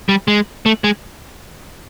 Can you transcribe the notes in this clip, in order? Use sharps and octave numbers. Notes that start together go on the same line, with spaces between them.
G3
G#3
A3
G#3